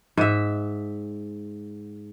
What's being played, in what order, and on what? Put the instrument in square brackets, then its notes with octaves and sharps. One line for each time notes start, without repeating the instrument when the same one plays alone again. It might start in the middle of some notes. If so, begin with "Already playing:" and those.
[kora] G#2 E5